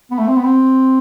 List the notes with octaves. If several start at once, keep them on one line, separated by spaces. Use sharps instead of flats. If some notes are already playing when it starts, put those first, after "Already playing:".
B3
A3
C4
B3
C4